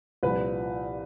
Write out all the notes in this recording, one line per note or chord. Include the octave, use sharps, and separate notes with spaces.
C2 A#2 F3 B4